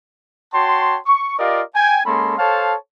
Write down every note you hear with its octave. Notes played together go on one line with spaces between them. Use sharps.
F#4 C#5 G5 A5 C6
C#6
F4 G4 A#4 D5 D#5 F5
G5 G#5
G#3 A#3 C#4 A4 B5 C6
A4 C5 C#5 F5 A5